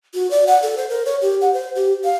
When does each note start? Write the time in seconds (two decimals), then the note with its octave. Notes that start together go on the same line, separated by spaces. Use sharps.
0.14 F#4
0.31 D5
0.47 F#5
0.63 A4
0.77 C5
0.90 A#4
1.06 C#5
1.22 G4
1.41 F#5
1.54 C5
1.75 G4
2.04 F5